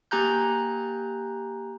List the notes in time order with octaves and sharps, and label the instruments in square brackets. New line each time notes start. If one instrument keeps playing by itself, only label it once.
[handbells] A#3 G4 G#5 A#5 F#6 G6